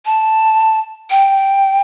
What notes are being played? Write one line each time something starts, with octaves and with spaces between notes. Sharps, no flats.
A5
G5